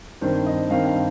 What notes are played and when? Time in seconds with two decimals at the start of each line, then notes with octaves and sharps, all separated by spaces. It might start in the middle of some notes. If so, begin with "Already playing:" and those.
0.21 G2 D#3 C4 C5
0.46 D#5
0.70 G2 D#3 C4 F5
0.87 F5